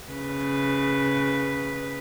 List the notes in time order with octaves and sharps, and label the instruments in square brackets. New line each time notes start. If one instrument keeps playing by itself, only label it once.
[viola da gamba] C#3 B4